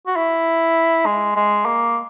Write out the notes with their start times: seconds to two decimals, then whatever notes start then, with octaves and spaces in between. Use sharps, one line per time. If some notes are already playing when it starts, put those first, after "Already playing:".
0.07 F#4
0.16 E4
1.06 G#3
1.36 G#3
1.66 A#3